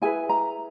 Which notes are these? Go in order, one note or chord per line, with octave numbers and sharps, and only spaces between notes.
E4 G#4 B4 G#5
A#5